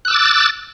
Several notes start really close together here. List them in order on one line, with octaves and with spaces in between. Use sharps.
F#6 E6 D6 A6